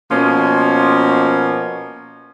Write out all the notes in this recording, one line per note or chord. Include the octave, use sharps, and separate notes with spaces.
B2 F3 A#3 C#4